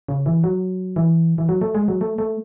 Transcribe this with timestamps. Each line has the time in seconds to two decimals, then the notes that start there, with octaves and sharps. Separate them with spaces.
0.08 C#3
0.26 E3
0.44 F#3
0.96 E3
1.38 E3
1.49 F#3
1.61 A3
1.75 G#3
1.88 F#3
2.01 A3
2.18 A3